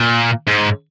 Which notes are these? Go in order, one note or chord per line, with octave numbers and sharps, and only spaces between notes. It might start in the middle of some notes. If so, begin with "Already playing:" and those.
Already playing: A#2
G#2